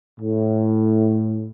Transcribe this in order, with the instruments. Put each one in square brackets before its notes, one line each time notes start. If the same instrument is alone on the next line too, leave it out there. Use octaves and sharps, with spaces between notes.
[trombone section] A2